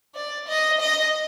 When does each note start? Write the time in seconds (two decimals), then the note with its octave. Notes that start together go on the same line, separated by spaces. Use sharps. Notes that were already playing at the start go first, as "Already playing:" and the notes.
0.15 D5
0.48 D#5
0.80 D#5